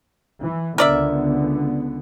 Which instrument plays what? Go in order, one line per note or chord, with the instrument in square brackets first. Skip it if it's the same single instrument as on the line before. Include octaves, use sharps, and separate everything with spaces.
[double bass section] E3
[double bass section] C#2 D3 B3 [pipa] A#4 D5 E5